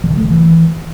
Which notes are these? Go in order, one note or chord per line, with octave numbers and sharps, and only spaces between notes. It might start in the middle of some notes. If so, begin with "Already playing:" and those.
F3
D#3
A3
D#3
E3